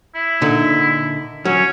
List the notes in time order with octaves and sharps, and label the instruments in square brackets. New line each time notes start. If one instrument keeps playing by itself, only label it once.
[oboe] E4
[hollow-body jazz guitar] A#2 D3 D#4
[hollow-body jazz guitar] F#3 [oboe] C#4